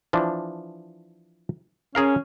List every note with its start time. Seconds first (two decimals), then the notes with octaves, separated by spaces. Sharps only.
0.13 E3 F3 D4
1.95 C#4 G#4 A#4 F5